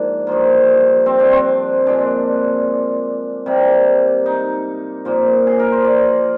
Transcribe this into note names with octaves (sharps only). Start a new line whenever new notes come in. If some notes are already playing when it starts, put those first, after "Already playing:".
Already playing: G#2 F3 A#3 D4
G2 F3 A#3
C4
D4
C4
A#2 G#3 D4
C3 G3 A#3
D#4
A#2 F3 A#3
G#4
A#4
C5
D5